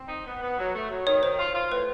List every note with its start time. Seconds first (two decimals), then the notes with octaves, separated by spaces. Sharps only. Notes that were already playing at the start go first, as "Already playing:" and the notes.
Already playing: C4
0.09 D#4
0.25 B3
0.42 B3
0.58 F#3
0.74 A3
0.90 F#3
1.07 D#3 C#5
1.23 D#3 C5
1.39 F4
1.55 F4
1.71 A2 B4